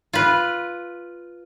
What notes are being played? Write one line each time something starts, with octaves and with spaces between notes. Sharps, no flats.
F4 B4